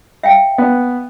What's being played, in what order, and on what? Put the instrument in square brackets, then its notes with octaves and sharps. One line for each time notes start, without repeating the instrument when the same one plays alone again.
[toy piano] E5 F5 G5
[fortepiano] B3